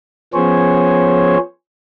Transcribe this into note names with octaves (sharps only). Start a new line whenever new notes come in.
F3 B3 C#4 G#4 C5 C#5